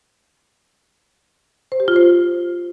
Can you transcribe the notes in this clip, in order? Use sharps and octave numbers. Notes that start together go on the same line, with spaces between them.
C5
G4
F4
C5